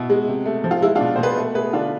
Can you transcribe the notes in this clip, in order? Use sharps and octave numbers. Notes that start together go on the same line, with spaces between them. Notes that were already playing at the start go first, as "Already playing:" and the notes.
Already playing: B2 E4
G#3
C3
A3
F3
F4
G#3 E4
D4 F4
B2
B2 C5
G#4 B4
A3
A3 G#4 B4
D3 D4 F4